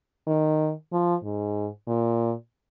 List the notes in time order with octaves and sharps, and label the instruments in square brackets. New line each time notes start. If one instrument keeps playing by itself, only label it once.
[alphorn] D#3
F3
G#2
A#2